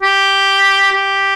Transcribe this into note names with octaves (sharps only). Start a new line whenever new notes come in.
G4
G4